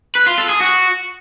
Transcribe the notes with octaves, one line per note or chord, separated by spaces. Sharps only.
B4
F4
A4
G#4
F#4